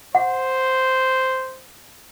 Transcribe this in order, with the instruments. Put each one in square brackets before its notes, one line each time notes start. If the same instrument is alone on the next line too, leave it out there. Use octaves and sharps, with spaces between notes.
[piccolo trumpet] C5 [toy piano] F#5